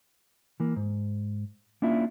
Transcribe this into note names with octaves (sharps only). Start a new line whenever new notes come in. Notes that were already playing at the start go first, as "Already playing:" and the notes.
E3 A#3
G#2
A#3 C#4 D4 E4 F4 E5